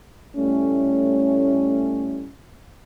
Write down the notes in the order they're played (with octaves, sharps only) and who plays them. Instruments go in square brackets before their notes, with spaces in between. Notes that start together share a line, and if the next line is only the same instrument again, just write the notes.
[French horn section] A2 G3 A3 C#4